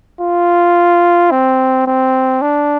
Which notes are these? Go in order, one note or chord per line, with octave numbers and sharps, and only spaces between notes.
F4
C4
C4
D4